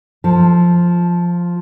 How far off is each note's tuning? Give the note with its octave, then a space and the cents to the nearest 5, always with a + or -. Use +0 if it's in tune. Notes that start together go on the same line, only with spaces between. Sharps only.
F3 +0 A4 +20